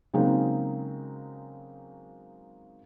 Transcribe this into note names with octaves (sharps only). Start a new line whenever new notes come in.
C#3 F#3 G#3 A#3 C4 D#4